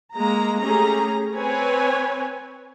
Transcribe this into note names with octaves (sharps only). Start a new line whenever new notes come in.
G#3 A#3 A#5
A3 C#4 G4 G#4 A#5
C4 B4 C#5 G#5